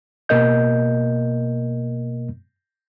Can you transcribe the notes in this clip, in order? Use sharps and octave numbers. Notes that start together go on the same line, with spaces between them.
B2 A#3 A#4 D#5 G6